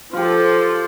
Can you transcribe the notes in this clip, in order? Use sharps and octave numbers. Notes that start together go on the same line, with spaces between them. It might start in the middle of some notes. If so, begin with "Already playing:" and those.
F3 F4 G4 A4